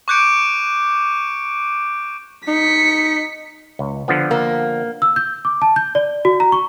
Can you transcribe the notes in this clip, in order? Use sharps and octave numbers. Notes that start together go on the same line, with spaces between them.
C#6 D6 F#6 G6 C#7 D7
D#4 B6 C#7
C#2
D3 F3 B3
A#3
E6
G6
D6
A5
G6
D5
F#4
A#5
C#6